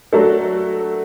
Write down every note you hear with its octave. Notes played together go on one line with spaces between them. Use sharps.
F#3 A3 D4 F#4 A4